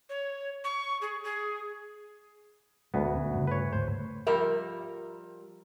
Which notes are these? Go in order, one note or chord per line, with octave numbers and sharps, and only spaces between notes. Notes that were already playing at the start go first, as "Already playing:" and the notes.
C#5
C#6
G#4
G#4
D2 G#3 B3
D#1 C#4
G2 C#3
B4 C#5
D2 G#2 A3 C5
F3 G3 A#4 E5